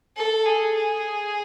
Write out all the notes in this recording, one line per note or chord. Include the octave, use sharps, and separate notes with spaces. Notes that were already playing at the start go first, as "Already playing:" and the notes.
A4
G#4
G#4